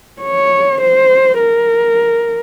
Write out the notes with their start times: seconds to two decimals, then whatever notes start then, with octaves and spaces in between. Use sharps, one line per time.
0.22 C#5
0.81 C5
1.39 A#4